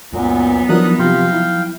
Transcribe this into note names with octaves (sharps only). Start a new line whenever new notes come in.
C#2 F#2 A#2 B3 D#4
F3 F#3 D4 E4 A#4 D#6 F#6
C3 F4 F5 G5 C6
E4